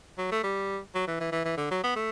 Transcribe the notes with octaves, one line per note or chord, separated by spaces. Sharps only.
F#3
A3
G3
F#3
E3
E3
E3
E3
D3
F#3
B3
A3